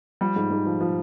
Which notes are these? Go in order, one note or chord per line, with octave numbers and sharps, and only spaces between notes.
F3 G3
G#2
G#2
F3
F3